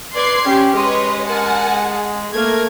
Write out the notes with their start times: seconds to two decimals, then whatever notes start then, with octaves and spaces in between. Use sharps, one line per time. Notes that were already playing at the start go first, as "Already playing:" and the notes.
0.14 B4 D5 C6 G#6 C7
0.45 C#4 G4 G5
0.76 G#3 B4 C#5 D#5 C6
1.27 A#4 F#5 G#5 A5
1.71 G#4
2.33 A3 A#3 A#4 G#6